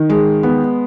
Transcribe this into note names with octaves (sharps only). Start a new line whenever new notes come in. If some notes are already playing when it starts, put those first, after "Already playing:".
Already playing: D#3
G#3
B3